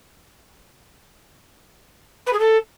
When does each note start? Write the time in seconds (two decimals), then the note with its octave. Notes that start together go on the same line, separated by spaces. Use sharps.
2.26 B4
2.33 G#4
2.39 A4